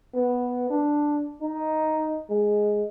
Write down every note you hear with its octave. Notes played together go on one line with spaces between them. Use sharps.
B3
D4
D#4
G#3